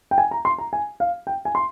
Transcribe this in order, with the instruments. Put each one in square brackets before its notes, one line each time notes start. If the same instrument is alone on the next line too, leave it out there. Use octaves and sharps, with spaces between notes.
[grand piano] G5
G#5
A#5
C6
A#5
G#5
F5
G5
G#5
C6